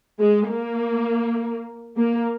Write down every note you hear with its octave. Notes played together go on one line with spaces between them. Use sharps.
G#3
A#3
A#3